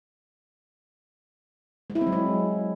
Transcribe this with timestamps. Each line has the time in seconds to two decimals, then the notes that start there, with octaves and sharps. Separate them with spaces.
1.90 G#3
1.95 E4
2.01 C4
2.07 F#3
2.12 G#3